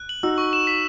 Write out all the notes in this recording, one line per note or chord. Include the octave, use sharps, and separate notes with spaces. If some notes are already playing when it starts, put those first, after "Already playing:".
Already playing: F#6
F#7
D#4 F#4 E6
C#6
E7
B6